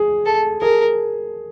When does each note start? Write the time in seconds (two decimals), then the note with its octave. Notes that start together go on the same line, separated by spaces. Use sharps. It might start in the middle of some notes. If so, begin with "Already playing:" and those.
Already playing: G#4
0.26 A4
0.61 G#4 A#4